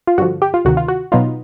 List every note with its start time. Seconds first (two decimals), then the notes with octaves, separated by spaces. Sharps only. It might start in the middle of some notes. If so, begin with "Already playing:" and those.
0.07 F4
0.18 G2 D3 F3 F#4
0.42 G4
0.54 F4
0.65 D2 C3 D#3 F#4
0.77 F4
0.88 F#4
1.12 B2 F#3 B3 D#4 F4